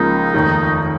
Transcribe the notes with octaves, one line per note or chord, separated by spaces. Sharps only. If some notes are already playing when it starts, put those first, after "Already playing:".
Already playing: C#2 C#3 F3 A#3 D#4
F1 D#2 D#3